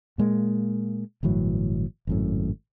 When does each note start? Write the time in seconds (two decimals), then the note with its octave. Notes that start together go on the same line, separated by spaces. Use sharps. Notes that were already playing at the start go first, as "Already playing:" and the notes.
0.18 A#2 G#3 A#3
1.23 G1 A2 E3 F#3
2.07 G#1 F#2 A2